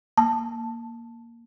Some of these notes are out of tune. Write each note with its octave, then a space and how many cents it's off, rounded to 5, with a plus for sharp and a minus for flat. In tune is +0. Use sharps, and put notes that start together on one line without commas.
A#3 +0 A5 +0